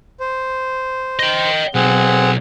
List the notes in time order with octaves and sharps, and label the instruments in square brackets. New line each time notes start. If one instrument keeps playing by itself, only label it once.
[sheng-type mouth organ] C5
[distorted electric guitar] D#5 G5
[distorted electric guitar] B1 [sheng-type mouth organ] C4 G#4 F#5